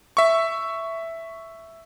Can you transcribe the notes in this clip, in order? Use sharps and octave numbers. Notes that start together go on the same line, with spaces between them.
E5 C#6